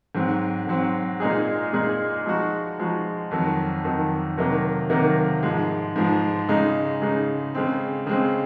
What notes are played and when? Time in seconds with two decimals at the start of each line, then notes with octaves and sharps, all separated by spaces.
0.15 G#2 F#3 C4
0.67 G#2 F#3 C4
1.20 A#2 G#3 D#4 G#4
1.73 A#2 G#3 D#4 G#4
2.25 F3 G#3 D#4 F#4
2.79 F3 G#3 D#4 F#4
3.31 F2 D#3 F#3
3.84 F2 D#3 F#3
4.37 C3 D#3 F#3 A#3
4.90 C3 D#3 F#3 A#3
5.43 G#2 F3 G#3
5.96 G#2 F3 G#3
6.49 C#3 G#3 D#4
7.02 C#3 G#3 D#4
7.55 C#3 G#3 C4
8.06 C#3 G#3 C4